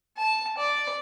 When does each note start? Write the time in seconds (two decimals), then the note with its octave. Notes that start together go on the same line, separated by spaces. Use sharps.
0.17 A5
0.58 D5